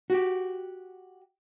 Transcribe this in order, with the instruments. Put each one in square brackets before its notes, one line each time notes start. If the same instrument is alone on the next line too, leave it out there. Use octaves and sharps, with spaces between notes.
[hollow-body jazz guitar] F#4 G4